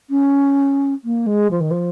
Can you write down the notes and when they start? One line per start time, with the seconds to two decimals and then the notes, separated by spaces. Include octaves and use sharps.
0.10 C#4
1.04 A#3
1.26 G#3
1.51 F3
1.60 D#3
1.71 F3